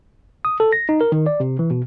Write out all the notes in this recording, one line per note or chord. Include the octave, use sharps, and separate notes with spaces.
D#6
A4
A#6
D#4
A#4
D#3
D5
C3
E3
B2